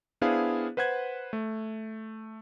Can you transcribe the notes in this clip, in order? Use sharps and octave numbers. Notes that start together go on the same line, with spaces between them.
B3 D4 E4 G#4 C5 F5
B4 C5 F#5 F#6 G#6
A3